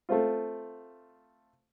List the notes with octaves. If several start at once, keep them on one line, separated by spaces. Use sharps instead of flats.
A3 C4 F4